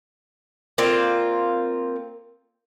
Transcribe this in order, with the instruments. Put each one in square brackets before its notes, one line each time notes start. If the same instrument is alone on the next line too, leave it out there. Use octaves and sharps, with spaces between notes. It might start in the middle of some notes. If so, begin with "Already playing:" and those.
[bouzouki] A#3 C4 F4 D5